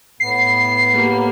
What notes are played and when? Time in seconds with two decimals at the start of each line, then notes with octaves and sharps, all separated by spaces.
0.20 A2 B3 C7
0.92 A#3 G4